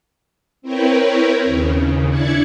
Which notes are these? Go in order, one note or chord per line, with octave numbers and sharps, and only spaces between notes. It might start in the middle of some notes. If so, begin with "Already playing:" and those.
C4 E4 A#4 B4 C#5 G5
D#2 C#3
D4 E4 D5 G#6 C#7